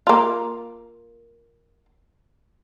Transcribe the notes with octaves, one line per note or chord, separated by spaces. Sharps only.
A#3 F4